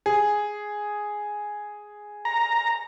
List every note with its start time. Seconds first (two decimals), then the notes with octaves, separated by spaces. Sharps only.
0.06 G#4
2.25 A#5